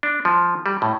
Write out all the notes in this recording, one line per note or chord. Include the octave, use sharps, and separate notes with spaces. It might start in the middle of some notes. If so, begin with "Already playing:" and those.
D4
F3
G3
A2